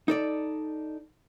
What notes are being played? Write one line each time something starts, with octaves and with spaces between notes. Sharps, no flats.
D#4 A4 D5